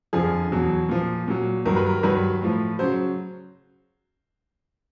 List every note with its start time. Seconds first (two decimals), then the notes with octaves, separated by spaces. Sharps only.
0.13 F2 D3 F3 G#4
0.52 E2 B2 F#3
0.89 A#2 F3
1.28 A#2 F#3
1.66 G2 D#3 F#3 A#4
1.76 B4
1.86 A#4
2.03 G2 D#3 F#3 B4
2.42 A2 F3
2.79 C#3 F#3 C5